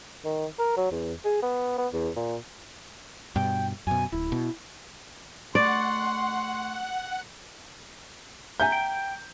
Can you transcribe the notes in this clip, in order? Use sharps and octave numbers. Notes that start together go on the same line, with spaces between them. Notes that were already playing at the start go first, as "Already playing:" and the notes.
D#3
A#4
F#3
E2
G#4
B3
B3
E2
A#2
G2 B2 G5
F#2 B2 G#5
D1 E4
B2
A3 D5 F#5 C6 C#6
E5 F#5 G#5 A#5 G6
G5